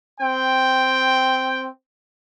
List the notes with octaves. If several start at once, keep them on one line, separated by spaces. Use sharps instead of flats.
C4 G5